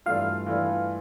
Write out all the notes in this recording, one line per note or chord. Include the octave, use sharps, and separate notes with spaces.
G2 E3 A3 D4 F4 F5
E3 A3 D4 F4